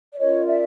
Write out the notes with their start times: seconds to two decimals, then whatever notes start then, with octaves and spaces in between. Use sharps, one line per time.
0.12 D5
0.18 C#4 F4 A#4 C#5 D#5
0.46 D5 E5